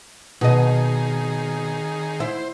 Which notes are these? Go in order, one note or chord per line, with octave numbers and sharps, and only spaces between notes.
B2 D#3 G#4 D#5
E4 C5